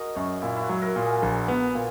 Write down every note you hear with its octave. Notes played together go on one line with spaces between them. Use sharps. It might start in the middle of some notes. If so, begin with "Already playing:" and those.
Already playing: F#4 G#4 A#4 D#5
F#2 C#5
A#2 E4
E4
F#4
F#3
A#4
A#2
G#4
A#1
B3
A#2